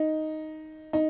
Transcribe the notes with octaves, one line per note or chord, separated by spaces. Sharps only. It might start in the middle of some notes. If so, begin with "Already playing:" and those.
Already playing: D#4
D#4